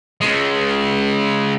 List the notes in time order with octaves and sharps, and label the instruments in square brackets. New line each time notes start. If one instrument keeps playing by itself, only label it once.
[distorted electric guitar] C#3 G#3